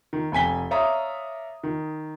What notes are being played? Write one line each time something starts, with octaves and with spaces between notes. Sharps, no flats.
D#3
F1 G5 G#5 B6 G7
C#5 D5 E5 F5 A#5 D#6
D#3